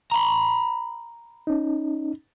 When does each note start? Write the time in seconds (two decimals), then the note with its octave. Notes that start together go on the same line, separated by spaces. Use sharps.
0.12 A#5 B5
1.47 C#4 D#4